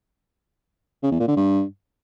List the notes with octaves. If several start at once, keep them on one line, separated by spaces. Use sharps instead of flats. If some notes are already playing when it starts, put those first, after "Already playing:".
C#3
E2
A#2
D3
G2